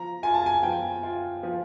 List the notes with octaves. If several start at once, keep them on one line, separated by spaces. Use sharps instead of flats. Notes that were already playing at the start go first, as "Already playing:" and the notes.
Already playing: F3 A#5
F4 G#5
A5
G#5
F3 G5
F4
F3